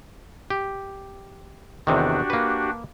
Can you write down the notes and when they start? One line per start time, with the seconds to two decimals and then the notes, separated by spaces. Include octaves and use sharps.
0.50 G4
1.87 E2 C3 D#3 D4 F#4 G4
2.30 A#3 B4